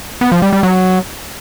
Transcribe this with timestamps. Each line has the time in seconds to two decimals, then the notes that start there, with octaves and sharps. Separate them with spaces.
0.21 B3
0.32 F3
0.42 G3
0.53 G3
0.63 F#3